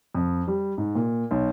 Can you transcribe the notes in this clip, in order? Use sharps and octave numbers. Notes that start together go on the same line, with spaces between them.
F2
G3
G#2
A#2
B1